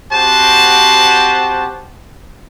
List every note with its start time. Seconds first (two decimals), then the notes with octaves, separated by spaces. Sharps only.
0.13 C4 F#4 G4 C5 F#5 A5